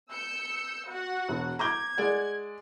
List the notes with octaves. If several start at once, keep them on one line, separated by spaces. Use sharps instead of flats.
E6 G6 C#7
F#4 F#5
E1
A#5 D6 G6 G#6
G#3 D5 F#5